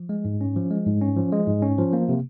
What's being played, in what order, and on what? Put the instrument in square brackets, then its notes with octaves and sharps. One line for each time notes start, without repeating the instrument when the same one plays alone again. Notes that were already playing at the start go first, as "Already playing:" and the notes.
Already playing: [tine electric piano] F3
G#3
G#2
C#4
F3
G#3
G#2
C#4
F3
G#3
G#2
C#4
F3
A#3
C3